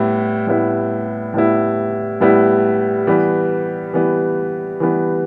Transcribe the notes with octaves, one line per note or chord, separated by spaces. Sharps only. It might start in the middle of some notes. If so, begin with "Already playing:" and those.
Already playing: A2 G3 B3 E4
A2 G3 B3 E4
A2 G3 B3 E4
A2 G3 B3 E4
E3 G3 B3
E3 G3 B3
E3 G3 B3